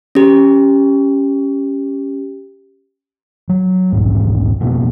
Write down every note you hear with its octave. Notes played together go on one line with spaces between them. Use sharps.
C#4 G4
F#3
D#1 B1 G#2
F1 B2 A#3 B3